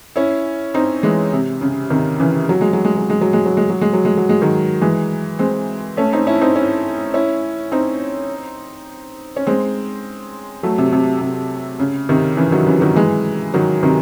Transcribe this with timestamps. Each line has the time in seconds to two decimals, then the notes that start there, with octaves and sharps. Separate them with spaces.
0.16 C#4 E4
0.74 C4 D#4
1.03 E3 G#3
1.33 C3
1.61 C#3
1.90 C3 D#3
2.20 C#3 E3
2.49 F#3
2.61 G#3
2.73 F#3
2.85 G#3
2.97 F#3
3.10 G#3
3.21 F#3
3.33 G#3
3.46 F#3
3.57 G#3
3.70 F#3
3.81 G#3
3.93 F#3
4.05 G#3
4.17 F#3
4.29 G#3
4.42 D#3 F#3
4.81 E3 G#3
5.39 G#3 C4
5.97 A3 C#4
6.13 C4 D#4
6.27 C#4 E4
6.41 C4 D#4
6.56 C#4 E4
7.14 C#4 E4
7.72 C4 D#4
9.36 C#4
9.47 G#3 C4
10.63 F#3 A3
10.78 C3
10.92 C3
11.21 C3
11.80 C#3
12.09 C3 D#3
12.37 C#3 E3
12.52 D#3 F#3
12.67 C#3 E3
12.81 D#3 F#3
12.96 E3 G#3
13.54 D#3 F#3
13.83 C3 D#3